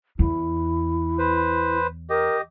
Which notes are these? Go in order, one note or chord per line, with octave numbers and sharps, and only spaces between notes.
E2 E4
B4 C5
G4 A#4 D#5